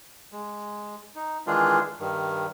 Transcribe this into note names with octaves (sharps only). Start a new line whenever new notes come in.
G#3
D#4
D#3 E3 G#3 D4 F4 G#4
G2 D#3